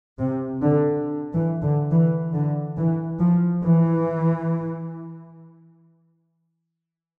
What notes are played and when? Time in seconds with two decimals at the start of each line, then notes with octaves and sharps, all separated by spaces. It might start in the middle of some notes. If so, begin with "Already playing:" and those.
0.19 C3
0.62 D3
1.33 E3
1.62 D3
1.90 E3
2.33 D3
2.76 E3
3.19 F3
3.62 E3